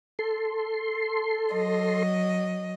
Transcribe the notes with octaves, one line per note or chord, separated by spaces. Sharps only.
A4 C6
F#3 D#5